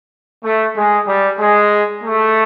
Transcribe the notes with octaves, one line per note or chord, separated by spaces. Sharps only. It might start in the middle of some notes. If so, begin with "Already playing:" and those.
A3
G#3
G3
G#3
A3